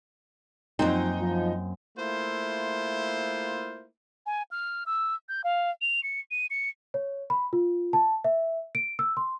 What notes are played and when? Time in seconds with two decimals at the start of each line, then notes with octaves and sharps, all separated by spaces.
0.79 F#2 F3 A#3 C4 D#4
1.20 F3
1.97 A3 A#3 E4 F4 C5
4.26 G#5
4.51 F6
4.86 E6
5.29 G6
5.44 F5
5.81 F7
6.03 C#7
6.31 D#7
6.50 C#7
6.94 C#5
7.30 B5
7.53 F4
7.93 A5
8.24 E5
8.75 D7
8.99 E6
9.17 C6